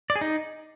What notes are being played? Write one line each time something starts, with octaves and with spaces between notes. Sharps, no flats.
D5
G#4
D#4